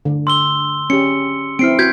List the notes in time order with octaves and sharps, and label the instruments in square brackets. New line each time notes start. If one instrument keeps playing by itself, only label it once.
[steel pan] D3
[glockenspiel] C6 E6 G7
[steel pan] C#4 G4 [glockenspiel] C#7
[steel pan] C4 E4 [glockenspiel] F6 C7 D7
[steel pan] F#4 [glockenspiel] G6 G#6 B6